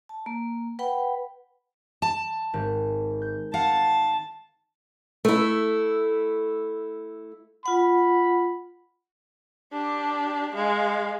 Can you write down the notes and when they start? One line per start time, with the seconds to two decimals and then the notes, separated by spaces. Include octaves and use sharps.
0.09 A5
0.26 A#3
0.79 B4 F#5 G5 B5
2.02 A5
2.53 G#1 C4 G4
3.22 G6
3.54 F5 F#5 A5
5.25 A3 E4
7.66 F4 F#5 B5
9.72 D4 G4
10.55 G#3 F5